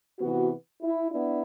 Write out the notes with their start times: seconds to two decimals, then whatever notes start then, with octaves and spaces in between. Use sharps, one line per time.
0.20 C3 E3 B3 F#4
0.82 E4
1.11 B3 D4 E4